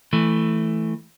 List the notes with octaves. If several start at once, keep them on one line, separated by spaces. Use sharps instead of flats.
E3 A3